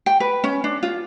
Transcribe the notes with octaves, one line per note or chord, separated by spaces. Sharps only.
G5
B4
C#4
D4
F4